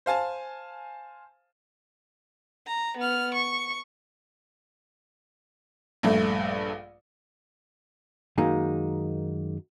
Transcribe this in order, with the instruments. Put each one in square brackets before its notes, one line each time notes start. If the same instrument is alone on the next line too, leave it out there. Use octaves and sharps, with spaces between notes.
[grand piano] C5 F5 G#5 A5
[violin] A#5
B3 F6
C#6
[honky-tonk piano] A#1 G2 A3
[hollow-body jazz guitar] F#2 D#3 G#3 A#3 D#4